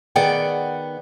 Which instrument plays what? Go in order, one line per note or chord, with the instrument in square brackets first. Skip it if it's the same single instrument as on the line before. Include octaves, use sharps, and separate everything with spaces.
[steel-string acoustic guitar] D#3 B3 G#4 D5 F#5 G5